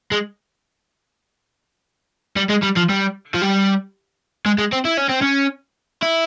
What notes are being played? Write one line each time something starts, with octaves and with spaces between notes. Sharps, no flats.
G#3
G3
G#3
G3
F3
G3
F3
G3
G#3
G#3
C4
E4
C#4
C4
C#4
E4